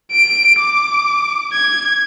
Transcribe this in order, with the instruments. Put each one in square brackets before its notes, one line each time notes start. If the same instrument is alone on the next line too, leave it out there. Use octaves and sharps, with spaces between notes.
[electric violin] D7
D6
G#6